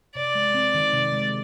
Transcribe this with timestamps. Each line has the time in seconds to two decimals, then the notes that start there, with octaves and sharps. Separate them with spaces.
0.15 C3 D5
0.35 G#3
0.54 C4
0.75 D#3
0.93 C3
1.13 G#3